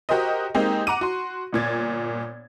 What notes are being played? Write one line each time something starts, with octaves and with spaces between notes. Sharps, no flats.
F#4 G4 A#4 C5 D#5
G#3 A#3 C4 D#4 G4
F#5 A#5 D6 D#7
F#4 C6
G1 A#2 G#6 A6